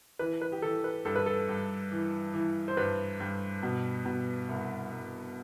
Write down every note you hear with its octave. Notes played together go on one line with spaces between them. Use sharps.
E3 B4
B4
G4
E3 A4
B4
G2 A4
B4
A4
G2
E3
E3
C5
G2 B4
G2
B2
B2
C2
C2